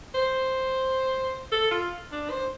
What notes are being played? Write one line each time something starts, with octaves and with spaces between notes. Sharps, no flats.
C5
A4
F4
D4
C5